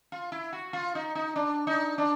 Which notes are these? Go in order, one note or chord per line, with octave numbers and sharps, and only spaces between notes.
F4
E4
F#4
F4
D#4
D#4
D4
D#4
D4